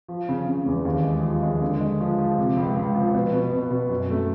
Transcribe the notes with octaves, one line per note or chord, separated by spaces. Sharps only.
F3
C#3
C#3
E2
D#2
G#3
F3
G#3
D3
G#3
F3
F3
C3
C#2
C#2
F3
B2
B2
B2
B2
F#2
A3